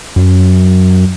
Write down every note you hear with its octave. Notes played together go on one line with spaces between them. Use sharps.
F#2